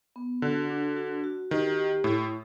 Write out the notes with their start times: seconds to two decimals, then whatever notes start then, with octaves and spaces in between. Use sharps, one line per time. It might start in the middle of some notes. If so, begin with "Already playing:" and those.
0.16 B3
0.42 D3 F#4
0.70 D4
0.97 F#4
1.24 F#4
1.51 D#3 G4
1.78 G4
2.04 A2 E4